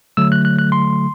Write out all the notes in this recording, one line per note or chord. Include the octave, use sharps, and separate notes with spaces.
D3 F#3 A3 E6
F#6
F#6
F#6
C6